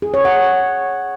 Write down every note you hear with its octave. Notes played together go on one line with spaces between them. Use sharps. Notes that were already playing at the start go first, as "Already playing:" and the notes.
G#4
C#5
F#5